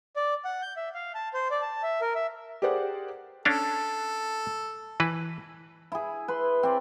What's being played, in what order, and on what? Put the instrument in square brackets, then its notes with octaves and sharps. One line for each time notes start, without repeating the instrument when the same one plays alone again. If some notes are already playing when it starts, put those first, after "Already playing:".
[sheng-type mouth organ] D5
F#5
G6
E5
F5
A5
C5
D5
A5
E5
A#4
E5
[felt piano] G4 G#4 A#4 C5 D5 F#5
[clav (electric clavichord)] C#4 D4 F5 [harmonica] A4
[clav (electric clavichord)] E3 B4
[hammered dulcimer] E4 G#4
B4 C6
C4 D5